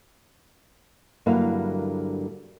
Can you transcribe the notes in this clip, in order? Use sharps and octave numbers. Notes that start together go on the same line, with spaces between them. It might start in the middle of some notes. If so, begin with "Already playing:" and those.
G2 D3 F#3 A#3 E4 F5